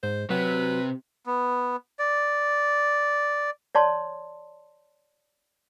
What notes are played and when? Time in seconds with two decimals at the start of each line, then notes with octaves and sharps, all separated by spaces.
0.03 G#2 C5
0.30 C3 F#3 B4
1.26 B3
1.99 D5
3.75 C#5 D5 A5 C6